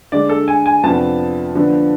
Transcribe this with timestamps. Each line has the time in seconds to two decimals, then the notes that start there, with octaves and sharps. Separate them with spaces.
0.12 D3 G#3 D4 D5
0.29 A4
0.48 G#5
0.66 G#5
0.83 F2 C3 F3 B3 D4 A5
1.55 D3 F3 B3 D4